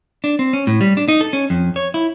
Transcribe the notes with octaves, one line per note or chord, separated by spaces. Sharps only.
D4
C4
C#4
A2
G3
D4
D#4
A4
C#4
F2
C#5
E4